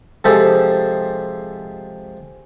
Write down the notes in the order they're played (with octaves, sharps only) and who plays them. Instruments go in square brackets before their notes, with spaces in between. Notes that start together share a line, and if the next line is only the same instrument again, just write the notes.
[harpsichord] C3 F3 G#3 G4 A4 C5